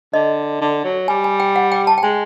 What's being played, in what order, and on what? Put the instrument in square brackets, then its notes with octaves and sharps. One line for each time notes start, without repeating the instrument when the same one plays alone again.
[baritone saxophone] D3 [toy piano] D#5
[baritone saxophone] D3
F#3
[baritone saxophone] G3 [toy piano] G#5
[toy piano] G#5
G5
F#5
G5
A5
G5
[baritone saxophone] G#3 [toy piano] G#5